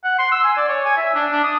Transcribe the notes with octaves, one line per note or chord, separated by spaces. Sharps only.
F#5
C6
E6
G#5
D5
C#5
G#5
E5
D4
D4
D#6